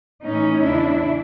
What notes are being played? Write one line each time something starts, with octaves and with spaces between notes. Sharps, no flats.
A2 E3 C#4 D#4
E2 C#3 E3 D4 E4